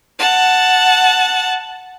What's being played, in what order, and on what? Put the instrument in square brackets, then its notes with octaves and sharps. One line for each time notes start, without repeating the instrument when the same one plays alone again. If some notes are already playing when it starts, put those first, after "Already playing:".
[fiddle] F#5 A5